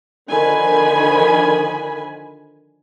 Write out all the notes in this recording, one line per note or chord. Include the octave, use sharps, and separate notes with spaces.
D3 D#3 F3 G#5 B5